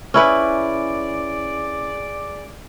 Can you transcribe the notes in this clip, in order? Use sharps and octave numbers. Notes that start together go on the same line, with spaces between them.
C#4 E4 G#4 B4 D5